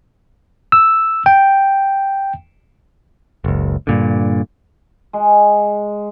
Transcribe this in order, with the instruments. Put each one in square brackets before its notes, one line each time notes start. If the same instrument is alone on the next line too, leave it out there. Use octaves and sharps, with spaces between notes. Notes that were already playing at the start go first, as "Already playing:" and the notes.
[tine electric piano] E6
G5
[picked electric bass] F#1 C#2
G2 A#2 D3
[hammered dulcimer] G#3